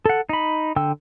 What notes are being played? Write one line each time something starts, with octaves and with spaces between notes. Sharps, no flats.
A4 F#5
D#4 B5
D3 G5 E6